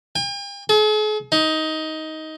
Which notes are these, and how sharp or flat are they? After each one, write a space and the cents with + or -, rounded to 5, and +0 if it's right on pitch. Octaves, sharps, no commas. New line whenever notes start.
G5 +45
G#4 +45
D#4 +15